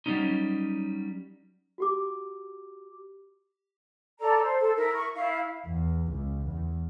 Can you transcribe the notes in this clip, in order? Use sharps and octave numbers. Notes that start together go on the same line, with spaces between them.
F#3 G3 A3 C#4 D#4
F#4 G4 D6
A4 D5 A#5
C5
A4
E4 A#4
C#6
E4 F5
E2
C#2
E2